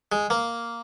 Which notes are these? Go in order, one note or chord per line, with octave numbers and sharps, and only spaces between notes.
G#3
A#3